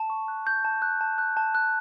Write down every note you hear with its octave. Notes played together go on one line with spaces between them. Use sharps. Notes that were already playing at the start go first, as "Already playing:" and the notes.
Already playing: A5
C#6
F#6
G6
A5
F#6
A5
F#6
A5
F#6